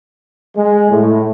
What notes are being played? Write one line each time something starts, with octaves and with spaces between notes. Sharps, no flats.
G#3
A2